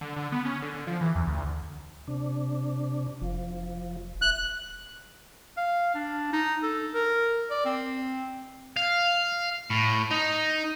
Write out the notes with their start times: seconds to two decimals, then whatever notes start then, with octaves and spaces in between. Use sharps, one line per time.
0.01 D3
0.16 D3
0.32 B3
0.45 C#4
0.62 D3
0.75 D3
0.87 F3
1.01 E3
1.15 E2
1.27 D2
2.08 C3 D4
3.21 F1 F3
4.22 D#1 E5 F#6
5.57 F5
5.95 D4
6.33 D#4
6.63 A4
6.94 A#4
7.51 D5
7.65 C4
8.77 F5
9.70 A2
10.11 D#4